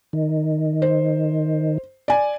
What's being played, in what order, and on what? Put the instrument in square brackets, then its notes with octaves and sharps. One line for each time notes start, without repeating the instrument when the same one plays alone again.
[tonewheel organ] D#3
[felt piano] C5
D5 G#5